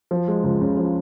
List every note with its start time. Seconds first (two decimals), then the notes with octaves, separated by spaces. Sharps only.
0.11 F3
0.28 G#3
0.44 C#2
0.61 C#3
0.77 F3